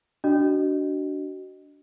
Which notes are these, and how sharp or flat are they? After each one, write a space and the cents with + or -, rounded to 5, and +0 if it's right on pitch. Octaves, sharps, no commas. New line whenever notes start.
D4 -10 F#4 +25 D#5 -15